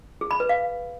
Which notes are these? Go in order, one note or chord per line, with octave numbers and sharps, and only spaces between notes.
G#4
B5
B4
F5